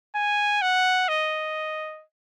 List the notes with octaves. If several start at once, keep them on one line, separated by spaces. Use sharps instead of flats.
G#5
F#5
D#5